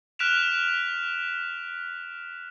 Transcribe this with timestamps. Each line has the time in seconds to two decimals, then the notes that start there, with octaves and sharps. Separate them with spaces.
0.19 F6 F#6 B6 D7 E7 F7